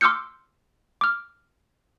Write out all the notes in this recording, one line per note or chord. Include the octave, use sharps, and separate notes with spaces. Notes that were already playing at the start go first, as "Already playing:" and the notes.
C6 D6 E6 F6 G6 C#7
D6 F6